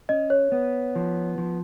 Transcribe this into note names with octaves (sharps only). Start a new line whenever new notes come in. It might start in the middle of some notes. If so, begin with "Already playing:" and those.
C#4 D#5
C#5
B3
F3
F3